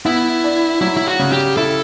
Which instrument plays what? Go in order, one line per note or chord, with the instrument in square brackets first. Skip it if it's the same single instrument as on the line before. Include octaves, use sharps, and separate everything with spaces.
[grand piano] B3 [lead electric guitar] E4
[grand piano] D4
[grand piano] F#3 [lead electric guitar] E4
[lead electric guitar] E4
F#4
[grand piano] C#3
[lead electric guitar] G4
[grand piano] E4 [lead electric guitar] A4